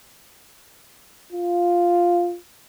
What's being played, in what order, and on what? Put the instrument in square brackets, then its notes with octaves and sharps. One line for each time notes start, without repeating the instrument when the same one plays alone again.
[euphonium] F4